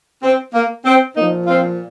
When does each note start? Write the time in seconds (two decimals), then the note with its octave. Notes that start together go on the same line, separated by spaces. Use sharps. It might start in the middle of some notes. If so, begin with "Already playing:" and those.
0.23 C4
0.53 A#3
0.85 C4
1.15 A#2 F3 A#3 D#4
1.47 C4 F4